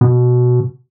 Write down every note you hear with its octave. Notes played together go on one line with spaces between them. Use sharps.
B2